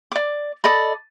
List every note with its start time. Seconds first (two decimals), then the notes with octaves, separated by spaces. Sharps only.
0.12 D5 D6
0.64 A4 D5 D#5 B5